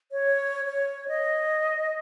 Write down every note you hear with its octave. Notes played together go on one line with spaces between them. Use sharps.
C#5
C#5
D#5